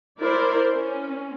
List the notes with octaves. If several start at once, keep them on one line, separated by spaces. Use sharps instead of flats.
E4 A#4 C5 D5
C#4